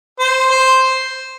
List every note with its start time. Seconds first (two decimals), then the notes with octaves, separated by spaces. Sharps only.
0.19 C5
0.50 C5